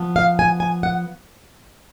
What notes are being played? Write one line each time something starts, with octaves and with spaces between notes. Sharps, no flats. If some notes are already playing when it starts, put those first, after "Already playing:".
Already playing: F3 B3
F5
G#5
G#5
F#5